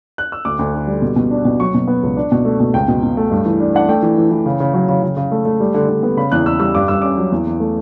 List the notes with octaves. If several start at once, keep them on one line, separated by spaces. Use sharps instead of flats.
F#6
E6
D2 D6
D2
D3
G3
B2
B2
D4
B2
F#3 C#6
B2
B3
C#2
D4
B2
A3
B2
C#2 G5
B2
B2
A3
G2
E3
D4
D4 F#5
A3 G5
E3
E3
E3
C#3
C#3
F#3
C#3
C#3
C#3
A3
A3
G3
D3
D3
B3
C#3 B5
E2 F#6
E2 E6
G3 E6
G2 D6
G2 E6
C#4 D6
F#3
E2
E2
A3